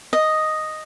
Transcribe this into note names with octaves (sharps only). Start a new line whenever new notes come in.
D#5